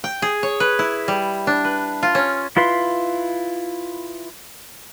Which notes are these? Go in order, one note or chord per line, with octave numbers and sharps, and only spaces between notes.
G5
G#4
C#5
B4
E4
G3
D4
B4
F4
C#4
E4 F4 B4 C6